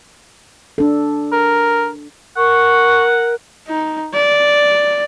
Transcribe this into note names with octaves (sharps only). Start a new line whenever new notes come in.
D4 A4
A#4
A#4 F#5 C#6
D#4
D5